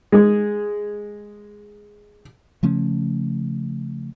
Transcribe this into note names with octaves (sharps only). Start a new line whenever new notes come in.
G#3 G#4
C#3 F3 A3 C#4